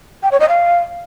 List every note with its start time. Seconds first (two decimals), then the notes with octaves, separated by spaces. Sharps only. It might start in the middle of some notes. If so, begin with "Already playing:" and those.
0.23 G5
0.31 C#5
0.40 D#5
0.49 F5